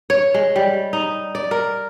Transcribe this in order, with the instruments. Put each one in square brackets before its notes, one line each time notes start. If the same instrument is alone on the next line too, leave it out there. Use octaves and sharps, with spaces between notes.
[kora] C#5
G#3
G3
D#4
D5
A#4